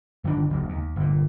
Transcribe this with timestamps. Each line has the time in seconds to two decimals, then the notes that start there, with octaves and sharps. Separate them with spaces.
0.24 G1 D#3 E3 D4
0.50 F#1 D2
0.69 D#2
0.96 G1 A#2